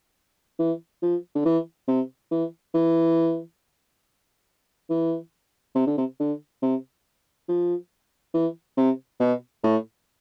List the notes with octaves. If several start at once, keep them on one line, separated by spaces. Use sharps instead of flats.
E3
F3
D3
E3
C3
E3
E3
E3
C3
D3
C3
D3
C3
F3
E3
C3
B2
A2